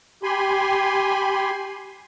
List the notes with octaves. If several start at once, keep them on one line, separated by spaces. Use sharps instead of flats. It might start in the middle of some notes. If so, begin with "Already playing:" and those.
G4 G#5 B5 C6